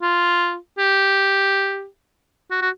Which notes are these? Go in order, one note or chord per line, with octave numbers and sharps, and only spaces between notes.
F4
G4
F#4
F#4